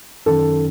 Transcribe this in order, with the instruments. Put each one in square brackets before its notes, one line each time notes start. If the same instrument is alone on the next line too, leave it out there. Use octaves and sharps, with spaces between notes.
[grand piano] F#2 D#3 A4